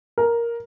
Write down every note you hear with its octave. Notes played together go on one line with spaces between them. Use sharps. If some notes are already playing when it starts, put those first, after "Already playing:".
A#4